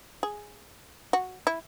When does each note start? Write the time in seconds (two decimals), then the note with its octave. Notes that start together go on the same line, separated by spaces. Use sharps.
0.23 G#4
1.13 F#4
1.47 E4